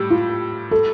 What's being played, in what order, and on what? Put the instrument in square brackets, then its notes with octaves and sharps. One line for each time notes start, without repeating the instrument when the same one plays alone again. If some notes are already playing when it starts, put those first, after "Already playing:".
Already playing: [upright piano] A2 G3 [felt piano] G4
[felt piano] F4
A4